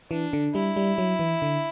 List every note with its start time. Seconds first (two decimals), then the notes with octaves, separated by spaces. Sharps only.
0.11 E3 D4
0.33 D3
0.55 G3 E4
0.77 G3
0.98 F#3
1.19 E3
1.42 D3